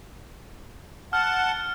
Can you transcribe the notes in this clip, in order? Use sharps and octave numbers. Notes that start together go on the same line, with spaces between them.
F#5 A5 F6